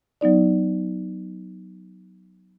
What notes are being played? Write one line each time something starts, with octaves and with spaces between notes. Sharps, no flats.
F#3 B3 D#4 D5